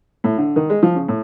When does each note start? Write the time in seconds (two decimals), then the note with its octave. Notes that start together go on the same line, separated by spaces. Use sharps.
0.24 A2
0.38 D3
0.56 D#3
0.70 G#3
0.83 F3
0.95 C#3
1.08 A2